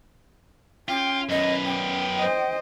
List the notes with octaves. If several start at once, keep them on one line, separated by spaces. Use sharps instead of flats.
C#4 F4 G5
F#2 B3 D#5
G5
C5 D#5